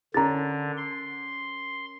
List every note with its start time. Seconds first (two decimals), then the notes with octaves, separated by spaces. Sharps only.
0.14 D3 C#4 A#4 A#5 A6
0.77 C6